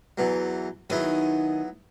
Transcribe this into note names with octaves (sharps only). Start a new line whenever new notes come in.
E2 E3 F#3
D#3 F#3 B3 D#4 E4 G#4